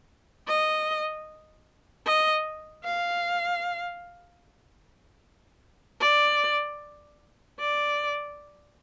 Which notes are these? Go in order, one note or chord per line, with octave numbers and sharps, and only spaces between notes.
D#5
D#5
F5
D5
D5